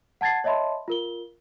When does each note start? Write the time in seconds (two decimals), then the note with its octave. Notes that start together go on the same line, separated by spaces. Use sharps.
0.21 F#5 A5 G#6 A6 C7
0.44 C#5 D#5 E5 A5 B5 C6
0.88 F4 A#4 G7